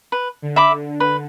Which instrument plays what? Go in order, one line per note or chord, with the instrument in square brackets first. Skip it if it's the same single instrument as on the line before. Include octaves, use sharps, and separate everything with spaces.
[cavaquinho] B4
[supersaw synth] D3
[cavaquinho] E5 B5 D6
B4